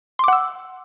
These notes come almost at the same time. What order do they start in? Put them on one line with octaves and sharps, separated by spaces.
C6 D6 F#5 E6